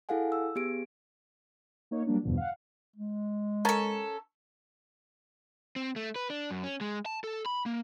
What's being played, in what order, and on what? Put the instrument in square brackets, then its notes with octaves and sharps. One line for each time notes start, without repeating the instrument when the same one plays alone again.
[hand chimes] E4 G#4 A4 F5 F#5 G#5
E6
B3 G4 G#4 D7
[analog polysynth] A#3 D#4 C#5
F#3 G3 A#3 D4
E2 G2 B2 D3 F3
F5 F#5
[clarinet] G#3
[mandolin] C#4 A4 [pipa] A#4 A5
[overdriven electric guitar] C4
A3
B4
D4
F#2
C#4
G#3
A5
A4
B5
A#3